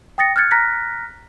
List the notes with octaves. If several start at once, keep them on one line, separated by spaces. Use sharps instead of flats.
G5 D#6 A6 A#6 C#7
F6 F#6 G#6 A6 C#7
A#5 F6 F#6 A#6 B6